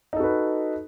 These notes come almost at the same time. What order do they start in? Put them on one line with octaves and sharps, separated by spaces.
D#4 A4 F#4 B4